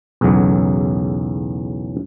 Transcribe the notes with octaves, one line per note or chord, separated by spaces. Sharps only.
B1 E2 A2 C#3 F#3